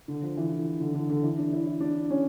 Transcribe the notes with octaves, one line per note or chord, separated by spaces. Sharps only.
D3
F3
E3
D3
D3
D3
D3
E3
D4
E4
E4
D4
C#4